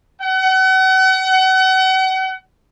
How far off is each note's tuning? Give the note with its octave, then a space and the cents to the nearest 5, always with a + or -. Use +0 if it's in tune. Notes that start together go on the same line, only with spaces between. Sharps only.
F#5 +35